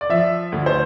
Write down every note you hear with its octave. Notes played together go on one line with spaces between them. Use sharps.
D5
F3 E5
D2
C5